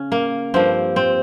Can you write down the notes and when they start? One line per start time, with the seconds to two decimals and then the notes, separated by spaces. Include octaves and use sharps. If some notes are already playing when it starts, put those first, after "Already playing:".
Already playing: C#3 C#4
0.12 A#3
0.54 G2 F3 A#3 C4
0.96 C4